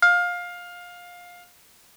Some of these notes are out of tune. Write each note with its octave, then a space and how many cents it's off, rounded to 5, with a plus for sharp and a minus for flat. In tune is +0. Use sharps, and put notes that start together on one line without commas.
F5 +20